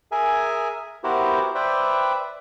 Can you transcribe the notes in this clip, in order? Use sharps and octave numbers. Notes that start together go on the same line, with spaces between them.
G#4 A#4 E5 G#5
B3 E4 F#4 G4 A#4 C5
B4 C5 D5 E5 G5